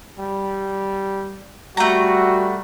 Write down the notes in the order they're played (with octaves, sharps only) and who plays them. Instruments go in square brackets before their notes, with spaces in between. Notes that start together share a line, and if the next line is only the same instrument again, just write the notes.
[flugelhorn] G3
[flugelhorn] G3 [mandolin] A3 A#5 [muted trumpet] F#4